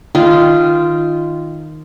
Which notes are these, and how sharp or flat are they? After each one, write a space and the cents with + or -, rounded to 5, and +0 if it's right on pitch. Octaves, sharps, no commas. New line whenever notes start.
D#3 +0 F4 -15